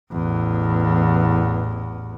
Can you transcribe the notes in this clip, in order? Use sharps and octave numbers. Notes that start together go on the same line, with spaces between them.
A1 E2